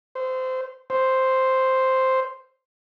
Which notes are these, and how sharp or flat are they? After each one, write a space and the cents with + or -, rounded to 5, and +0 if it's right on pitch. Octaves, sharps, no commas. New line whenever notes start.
C5 -20
C5 +0